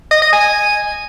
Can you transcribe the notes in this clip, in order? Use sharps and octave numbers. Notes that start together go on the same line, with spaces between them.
D#5
D#5
G#5